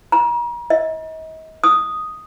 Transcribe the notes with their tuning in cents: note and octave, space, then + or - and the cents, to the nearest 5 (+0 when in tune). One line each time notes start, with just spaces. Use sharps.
A#5 +40
D#5 +40
D#6 +0